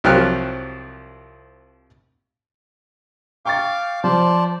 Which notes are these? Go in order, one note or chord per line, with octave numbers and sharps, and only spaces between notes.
C2 F3 F#3 G4 F6 F#6
F5 G5 C#6 D6 A6
F3 C5 D5 A5